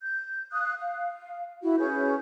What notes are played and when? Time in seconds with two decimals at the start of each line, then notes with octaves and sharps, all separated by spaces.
0.01 G6
0.51 F5 D#6 F#6
0.80 F5
1.62 E4 F#4
1.78 C#4 G#4 B4 G6